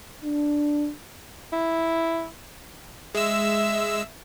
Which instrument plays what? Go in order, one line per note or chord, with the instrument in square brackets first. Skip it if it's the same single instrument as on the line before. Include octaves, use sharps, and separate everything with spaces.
[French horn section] D4
[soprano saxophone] E4
[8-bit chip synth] G#3 E6 [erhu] E5